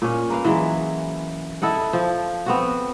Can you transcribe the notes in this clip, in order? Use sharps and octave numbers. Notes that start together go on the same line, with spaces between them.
A#2 C#4
A#3 B4 F5
E3 F#3 G#3
E4 A4 D#5 F#5
F3
B3 C4 F#4